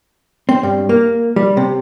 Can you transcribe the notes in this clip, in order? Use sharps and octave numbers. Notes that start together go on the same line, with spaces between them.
C4
G2
A#3
G3
C3